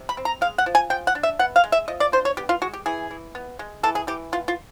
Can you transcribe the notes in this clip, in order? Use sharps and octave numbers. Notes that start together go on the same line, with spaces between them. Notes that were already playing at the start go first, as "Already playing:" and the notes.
Already playing: C3
B5
C4
A#5
G#3 F5
F#5
F3
G#5
F3 G5
F#5
D4
E5
B3 F#5
F5
G#3
E5
F3 D#5
D5
D4 C5
C#5
B3 G4
F4
G#3 F#4
G4
E3 G#4
E3
B3
G#3
E3 A4
G#4
E3 G4
B3 F4
F4